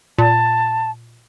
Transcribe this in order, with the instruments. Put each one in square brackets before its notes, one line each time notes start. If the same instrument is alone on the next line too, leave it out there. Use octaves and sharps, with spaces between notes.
[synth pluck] A#2 [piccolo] A5